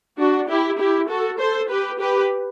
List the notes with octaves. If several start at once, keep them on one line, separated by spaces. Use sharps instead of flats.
D4 F#4
E4 G4
E4 G4
F#4 A4
A4 C5
G4 B4
G4 B4